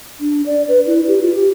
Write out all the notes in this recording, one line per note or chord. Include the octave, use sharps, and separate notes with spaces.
D4
D5
B4
E4
G4
F4
G4